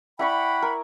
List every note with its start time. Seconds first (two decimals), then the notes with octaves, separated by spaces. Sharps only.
0.19 E4 D5 F#5 G5 B5 C#6
0.62 A#4